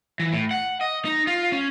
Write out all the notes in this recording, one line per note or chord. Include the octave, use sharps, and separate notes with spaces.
E3
A2
F#5
D#5
D#4
F4
C#4